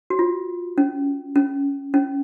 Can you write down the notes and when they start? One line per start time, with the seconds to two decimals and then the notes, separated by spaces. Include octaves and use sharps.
0.10 F#4
0.19 F4
0.78 C#4
1.36 C#4
1.94 C#4